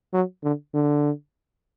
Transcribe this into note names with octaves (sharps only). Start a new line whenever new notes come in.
F#3
D3
D3